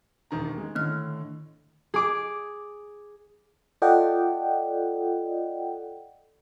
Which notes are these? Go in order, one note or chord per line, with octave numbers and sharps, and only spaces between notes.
E1 D#3 A#5
G#3
A2 D3 D#3 F6
G#4 D6
F4 A4 D5 D#5 F#5 G5